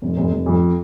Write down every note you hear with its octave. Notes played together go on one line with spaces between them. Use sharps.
F1
F1
F1
F2